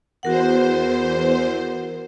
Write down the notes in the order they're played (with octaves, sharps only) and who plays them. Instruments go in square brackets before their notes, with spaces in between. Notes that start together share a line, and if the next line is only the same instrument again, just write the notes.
[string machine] E2 C5 [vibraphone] F#4 A#4 F#5